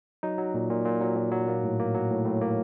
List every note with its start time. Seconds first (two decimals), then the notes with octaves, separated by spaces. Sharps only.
0.23 F#3 D#4
0.38 F#3
0.54 A#2
0.70 A#2
0.86 A#2
1.01 F#3
1.16 A#2
1.32 F#3
1.48 A#3
1.63 A2
1.79 A#3
1.95 F#3
2.10 A2
2.25 A2
2.41 A#3